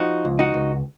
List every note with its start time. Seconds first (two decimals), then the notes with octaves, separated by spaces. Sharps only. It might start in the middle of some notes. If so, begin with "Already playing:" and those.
Already playing: F3 D#4 F#4
0.25 C#2
0.39 D#4 F#4
0.54 C#2